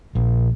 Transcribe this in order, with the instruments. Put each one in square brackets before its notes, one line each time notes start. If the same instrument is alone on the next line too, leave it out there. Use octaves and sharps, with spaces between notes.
[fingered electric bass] A#1